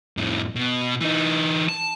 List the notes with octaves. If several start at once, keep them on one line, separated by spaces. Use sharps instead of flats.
F2 A2
B2
E3 D#4
A5